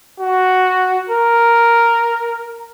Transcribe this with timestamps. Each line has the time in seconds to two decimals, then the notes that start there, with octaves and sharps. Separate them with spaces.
0.19 F#4
1.10 A#4